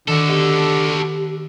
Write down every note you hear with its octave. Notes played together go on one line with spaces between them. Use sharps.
D3 D#3 F#4 A4
B3 G4 D#5 F#5